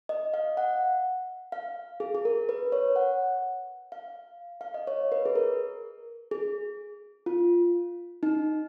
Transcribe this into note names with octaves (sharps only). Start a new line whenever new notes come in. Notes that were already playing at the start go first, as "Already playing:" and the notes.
D#5
F5
F#5
F5
G#4
G#4
A#4
B4
C#5
F#5
F5
F5
D#5
C#5
B4
G#4
A#4
G#4
F4
D#4